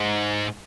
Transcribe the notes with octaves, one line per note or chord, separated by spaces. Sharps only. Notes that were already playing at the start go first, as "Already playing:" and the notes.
Already playing: G#2